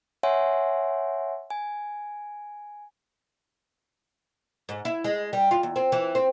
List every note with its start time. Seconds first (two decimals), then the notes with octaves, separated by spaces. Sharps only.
0.23 C#5 E5 F#5 G#5 C6
1.50 G#5
4.69 G#2
4.85 E4
5.04 G#3
5.33 G3
5.51 F4
5.63 E2
5.76 C4
5.92 E3
6.15 C4